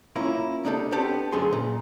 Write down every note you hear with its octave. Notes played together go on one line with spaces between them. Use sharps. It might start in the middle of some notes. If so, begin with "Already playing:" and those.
A#3 C#4 E4 F4
A#3 D4 D#4 G4 A4
B3 C4 D4 G4 A4
F#2 D3 A3 B3 G#4 C6
A#2